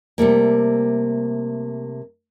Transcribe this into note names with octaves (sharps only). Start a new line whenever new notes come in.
C3 G3 A3 A#3